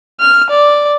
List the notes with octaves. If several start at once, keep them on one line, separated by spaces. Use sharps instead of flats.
F6
D5